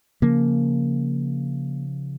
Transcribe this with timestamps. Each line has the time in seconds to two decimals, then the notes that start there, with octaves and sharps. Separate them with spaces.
0.22 C#3 F3 A#3